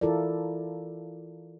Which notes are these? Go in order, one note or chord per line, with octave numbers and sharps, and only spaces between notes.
E3 E4 F4 A4 A#4 D5